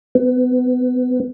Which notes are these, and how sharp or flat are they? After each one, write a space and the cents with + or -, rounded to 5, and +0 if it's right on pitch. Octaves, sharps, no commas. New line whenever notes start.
B3 +30